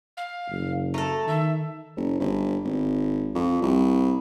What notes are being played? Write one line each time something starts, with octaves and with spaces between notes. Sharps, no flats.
F5
F#1
A3 A4 A#5
D#3 E5
F#1
G1
G#1
F2
C2